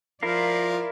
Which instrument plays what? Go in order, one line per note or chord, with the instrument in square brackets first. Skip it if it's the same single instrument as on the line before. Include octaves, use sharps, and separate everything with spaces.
[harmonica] F3 [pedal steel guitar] E4 A#4 F5 [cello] F4 D5